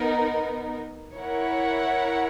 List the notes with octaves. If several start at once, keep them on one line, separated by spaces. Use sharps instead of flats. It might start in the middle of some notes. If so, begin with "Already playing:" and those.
Already playing: B3 D#4 A#4
E4 A#4 C#5 F#5